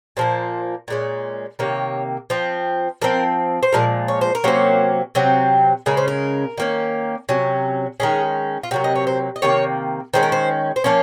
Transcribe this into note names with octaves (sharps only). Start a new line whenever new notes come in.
A#2 F3 A#3 C5
A#2 G#3 C#4
C3 D#3 A#3 C#5
F3 C4
F3 C4 A#4
C5
A#2 F3 G#3 A#4
C#5
C5
A#4
C3 F#3 A#3 C#4 C5
C3 F#3 C4
C#3 G#3 C#4 A#4
C5
A#4
D#3 A#3 C#4
C3 F#3 C#4
D#3 G#3 C#4 G#4
F4
C3 F#3 A#3 F#4
D#5
C#5
C5
D#5
C3 D#3 A#3 C#5
D#3 G#3 C#4 C5
A#4
C5
C5
F3 A#3 C#4 C#5